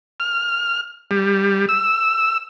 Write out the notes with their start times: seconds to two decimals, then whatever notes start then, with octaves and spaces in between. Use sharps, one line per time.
0.20 F6
1.11 G3
1.69 E6